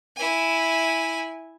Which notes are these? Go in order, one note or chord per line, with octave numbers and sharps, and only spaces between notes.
E4 G#5